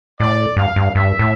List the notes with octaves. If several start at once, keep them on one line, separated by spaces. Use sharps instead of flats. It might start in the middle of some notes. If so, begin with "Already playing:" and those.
A2 D5
G2 F5
G2
G2 E5
A2